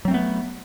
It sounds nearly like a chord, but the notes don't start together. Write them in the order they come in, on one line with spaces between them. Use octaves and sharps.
F#3 C4 A3 B3